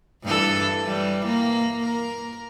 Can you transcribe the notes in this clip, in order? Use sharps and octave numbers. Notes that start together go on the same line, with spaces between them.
G2 E3 A4
E3 G3
A#3
A#4